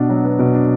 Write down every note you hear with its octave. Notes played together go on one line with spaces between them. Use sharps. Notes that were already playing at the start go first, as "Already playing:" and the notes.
Already playing: B2 B3 D4
F#3
B3
B2
D4